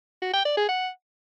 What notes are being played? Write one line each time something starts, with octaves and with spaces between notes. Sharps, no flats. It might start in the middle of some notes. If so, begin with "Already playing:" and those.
F#4
G5
D5
G#4
F#5